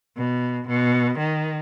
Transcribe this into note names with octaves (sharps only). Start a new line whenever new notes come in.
B2
B2
D#3